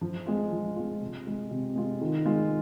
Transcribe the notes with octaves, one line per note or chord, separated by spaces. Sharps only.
F3
G#3 F4
F3
G#3 F4
C3
G#3 F4
C3
G#3 F4
D#3
G#3 F4